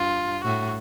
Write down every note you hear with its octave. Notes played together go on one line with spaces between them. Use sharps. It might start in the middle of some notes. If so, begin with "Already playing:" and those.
Already playing: G2 F4
A2 F#4